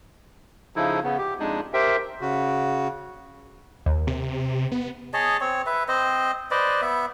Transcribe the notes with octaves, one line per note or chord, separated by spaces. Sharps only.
C#3 F3 D#4 E4 A4
C#3 B3
G4
F2 G#3 D4 D#4
G4 A#4 C5 E5 G5
C#3 F#4
D#2
C3
B3
G#4 C#5 D#5 A5
C4 C#5
B4 E5
C4 C5 D#5
B4 C5 D5 D#5
B3 E5